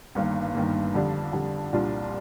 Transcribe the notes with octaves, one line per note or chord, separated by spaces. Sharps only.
G1 G2 D#3 A#3
G1 G2 D#3 A#3
F2 D3 G3 D4
F2 D3 G3 D4
C2 A#2 G3 D4 F4